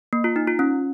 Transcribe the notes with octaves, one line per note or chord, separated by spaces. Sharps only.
A#3
F4
D#4
F4
C#4